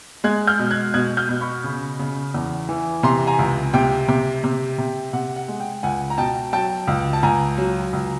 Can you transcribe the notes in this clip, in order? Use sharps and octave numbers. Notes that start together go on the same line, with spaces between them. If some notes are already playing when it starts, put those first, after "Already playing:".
G#3 F#6 G#6
F6 G6
B2
F#6 G#6
B2 F#6 G#6
F6 G6
B2
B5 C#6
C#3
C#3
E2
E3
C3 A#5 C6
G#5 A#5
C#2
C3 G5
C3
C3
C3
C3 F#5
F#5
G#3
G5
C#2 F#5 G#5
A#5
B2 G5 A5
F#3 G5 A5
C#2
A5
C#2 G#5 A#5
F#3
C#2